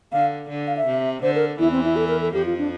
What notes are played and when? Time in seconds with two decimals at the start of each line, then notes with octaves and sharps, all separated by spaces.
0.12 D3 F5
0.49 D3
0.67 F5
0.77 E5
0.86 C3
1.22 D3 C5
1.35 A#4
1.59 E2 E3 E4
1.72 C4
1.84 E4
1.96 A4
2.08 A#4
2.21 A4
2.34 F2 F3 G4
2.46 F4
2.58 D4